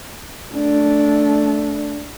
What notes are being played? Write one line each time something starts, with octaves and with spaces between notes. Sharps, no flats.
A3 D4